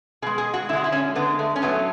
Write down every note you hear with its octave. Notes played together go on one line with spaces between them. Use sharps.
B2 G#3 G#4
G#4
F#4
D3 G#3 E4 F#4
E4
C#4
D3 G#3 B3
A3
C#4
A2 F#3 A3 B3